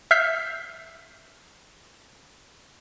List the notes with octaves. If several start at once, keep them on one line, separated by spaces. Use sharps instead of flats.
E5 F6 G6 B6 C7